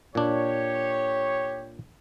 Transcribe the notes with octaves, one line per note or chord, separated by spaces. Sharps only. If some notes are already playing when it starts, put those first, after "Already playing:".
A#2 D4 G4 C#5